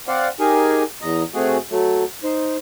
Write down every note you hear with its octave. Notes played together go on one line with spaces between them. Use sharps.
C4 C5 D5 F5 F#5
D#4 G4 G#4 A#4 G#5
E2 D#5 A#5
C3 A3 F#4 G#4
F#3 A3
D#4 C5